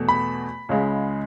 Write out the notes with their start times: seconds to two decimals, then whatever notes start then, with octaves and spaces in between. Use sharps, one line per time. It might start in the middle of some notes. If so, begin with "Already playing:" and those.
Already playing: E2 B2 A3
0.09 B5
0.69 C#2 C#3 G#3